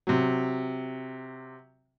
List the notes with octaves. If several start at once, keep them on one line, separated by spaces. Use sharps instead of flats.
C3 F#3